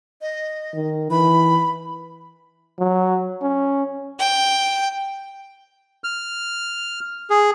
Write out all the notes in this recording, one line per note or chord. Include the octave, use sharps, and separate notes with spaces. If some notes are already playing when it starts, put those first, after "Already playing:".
D#5
D#3
E3 B5
F#3
C#4
G5
F6
G#4